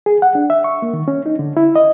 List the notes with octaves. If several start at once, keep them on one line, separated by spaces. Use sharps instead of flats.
G#4
F#5
D4
E5
C#6
A#3
D#3
C#4
D#4
D3
E4
D#5